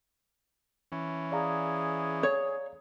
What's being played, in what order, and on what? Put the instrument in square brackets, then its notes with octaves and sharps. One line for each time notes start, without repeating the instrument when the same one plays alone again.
[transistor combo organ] E3 C#4
[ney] G#4 [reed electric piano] D5 F5 A#5
[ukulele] C#5